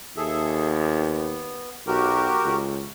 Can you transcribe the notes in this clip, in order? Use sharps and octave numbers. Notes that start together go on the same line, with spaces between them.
D#2 G#4 A4 E5
B3
B1 F#4 G4 A#4
C#2